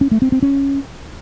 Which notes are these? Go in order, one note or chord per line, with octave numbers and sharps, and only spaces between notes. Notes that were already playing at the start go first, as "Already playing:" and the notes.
C#4
A3
C4
C4
C#4